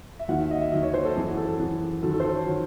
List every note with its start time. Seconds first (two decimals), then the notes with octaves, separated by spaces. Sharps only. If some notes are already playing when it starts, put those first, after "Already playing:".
0.19 E5
0.28 D#2 D#3 F#3 F#5
0.40 E5
0.51 D#5
0.61 E5
0.72 D#2 D#3 F#3 D#5
0.83 C#5
0.94 C5
1.05 A4
1.16 F#2 E3 G#4
1.27 F#4
1.37 A4
1.48 A4
1.59 F#2 E3 G#4
2.02 F#2 D#3 F#3 A4
2.14 A4
2.20 C5
2.24 A4
2.35 C#5
2.46 D#3 F#3